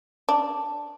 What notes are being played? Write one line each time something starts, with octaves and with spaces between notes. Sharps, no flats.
D4